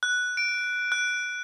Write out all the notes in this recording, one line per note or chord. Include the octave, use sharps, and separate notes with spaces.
F#6
D7
F#6